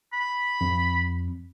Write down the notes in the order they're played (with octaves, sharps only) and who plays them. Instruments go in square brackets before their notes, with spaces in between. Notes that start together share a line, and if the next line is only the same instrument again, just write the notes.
[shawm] B5
[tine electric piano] F2